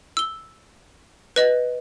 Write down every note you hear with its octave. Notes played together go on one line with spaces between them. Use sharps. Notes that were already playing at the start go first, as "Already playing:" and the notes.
E6 G7
B4 D#5